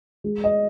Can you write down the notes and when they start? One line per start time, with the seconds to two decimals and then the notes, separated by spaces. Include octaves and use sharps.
0.24 G#3
0.44 D#5